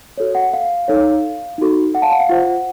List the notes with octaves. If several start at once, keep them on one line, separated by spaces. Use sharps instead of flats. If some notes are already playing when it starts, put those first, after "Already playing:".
F#4 A4 C#5
F#5
F5
D#4 A4 C#5
D#4 F#4 A4
F#5
F5 A5
F#5
F5
F4 C5 F#5